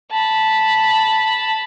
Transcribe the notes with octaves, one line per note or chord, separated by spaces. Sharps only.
A5 B5